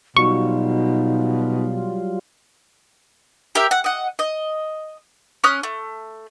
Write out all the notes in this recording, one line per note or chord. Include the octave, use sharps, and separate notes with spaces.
B2 F#3 G3 D#4 F4 C#6
G4 A#4 E5
F#5
D#5 F#5
D#5
C#4 D#6 F6 F#6
A3